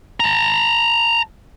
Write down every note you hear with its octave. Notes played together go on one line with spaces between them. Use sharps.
A5 A#5